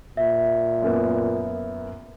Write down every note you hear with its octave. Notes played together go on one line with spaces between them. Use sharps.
A#2 E5
F#2 A#3 B3